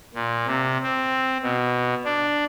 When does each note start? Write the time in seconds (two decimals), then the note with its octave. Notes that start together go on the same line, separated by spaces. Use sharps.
0.14 A#2
0.47 C3
0.83 C4
1.43 B2
2.05 D4